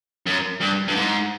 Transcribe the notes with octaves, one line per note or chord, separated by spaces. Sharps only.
F#2
G2
G2
G#2